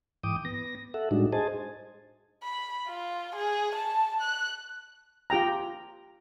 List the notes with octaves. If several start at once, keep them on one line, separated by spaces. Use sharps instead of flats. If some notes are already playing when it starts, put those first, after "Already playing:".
G#2 E3 G5 D6 D#6
B3 A#6
A4 E5 F#5
A2 G3 G#3 D4 D#4 F#4
G#4 C5 D#5 G#5 A5
B5
F4
G#4
A5
F#6
F4 G4 G5 A#5